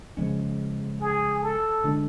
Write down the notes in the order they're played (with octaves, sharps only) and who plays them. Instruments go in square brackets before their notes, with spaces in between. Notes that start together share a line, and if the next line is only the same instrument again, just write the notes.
[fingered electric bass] C#3 F3 G#3 C#4
[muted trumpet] G#4
A4
[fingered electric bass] D3 G#3 D4